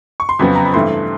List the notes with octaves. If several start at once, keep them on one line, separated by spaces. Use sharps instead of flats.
C#6
C6
F2 C#3 F#3 B3 B5
A#5
B5
G2 E3 A3 C4 C6